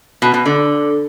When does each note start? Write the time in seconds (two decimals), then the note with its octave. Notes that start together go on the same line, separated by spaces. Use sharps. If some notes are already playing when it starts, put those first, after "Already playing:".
0.22 B2
0.34 B2
0.46 D3